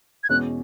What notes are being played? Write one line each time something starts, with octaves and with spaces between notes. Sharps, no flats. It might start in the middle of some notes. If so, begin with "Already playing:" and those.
G#6
E2 B2 G#3 C#4 F#6